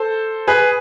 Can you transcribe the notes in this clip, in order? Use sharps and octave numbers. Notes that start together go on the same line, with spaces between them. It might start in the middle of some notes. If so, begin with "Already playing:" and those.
Already playing: A4 C5
G#4 B4